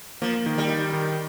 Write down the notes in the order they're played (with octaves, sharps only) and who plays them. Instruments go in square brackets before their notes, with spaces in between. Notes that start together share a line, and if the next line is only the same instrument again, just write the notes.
[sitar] F3 [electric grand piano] A#3
[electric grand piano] D#3
[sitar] G3
[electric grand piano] D#4
D#3